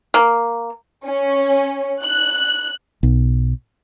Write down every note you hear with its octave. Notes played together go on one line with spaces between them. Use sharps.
A#3
C#4
F#6
B1